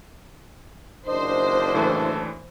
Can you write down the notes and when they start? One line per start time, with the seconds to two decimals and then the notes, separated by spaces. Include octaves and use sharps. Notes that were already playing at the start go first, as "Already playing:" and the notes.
1.08 F#1 D#2 D4 C5 D#5
1.75 A2 E3 A4